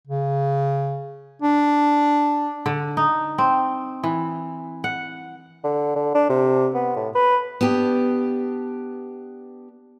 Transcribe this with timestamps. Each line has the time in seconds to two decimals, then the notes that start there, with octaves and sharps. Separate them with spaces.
0.07 C#3
1.42 D4
2.66 D3
2.97 D#4
3.38 C4
4.03 E3
4.84 F#5
5.64 D3
5.96 D3
6.15 D4
6.29 C3
6.75 B3
6.96 A2
7.15 B4
7.61 B3 D4 G4